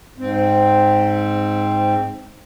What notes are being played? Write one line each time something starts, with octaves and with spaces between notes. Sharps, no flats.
G#2 C4